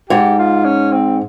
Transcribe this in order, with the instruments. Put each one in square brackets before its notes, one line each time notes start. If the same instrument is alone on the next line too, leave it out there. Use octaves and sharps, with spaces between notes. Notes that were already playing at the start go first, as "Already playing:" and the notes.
[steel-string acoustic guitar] G#2 [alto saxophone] G4
[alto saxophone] F4
C#4
C4